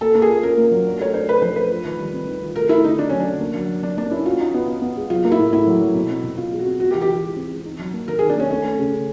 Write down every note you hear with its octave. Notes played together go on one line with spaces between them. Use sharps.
A#3 A4
A#3
G#4
F4
C#4 A#4
A#3
F#3
D4
A3 C#5
D4 C5
D4 B4
F3 C5
A3 B4
F4
D#3
G3
C4
D#3
F4
A3 A#4
A3 E4
D3 D#4
A3 D4
F#3 C#4
D4
D3
A#3
F#3
F#3
F#3 D4
A#3 D4
C#4 E4
F4 F#4
D#4
B3
B3
B3
G#3
F#3 F4
A#3
E4
A2
A2 E4
F#3
F#3
B2
C4
B2
B2 F4
G#3
F#4
C4
F4 F#4
G4
E3
G4
E3
G#3
C4
G#3
D#4
F#3
A#3
D#3 A#4
D#4 G#4
D4
A#3 C#4
A3 C#4
A3
C#3
C#3